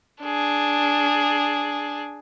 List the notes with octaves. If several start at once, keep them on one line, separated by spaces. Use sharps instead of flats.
D4 G#4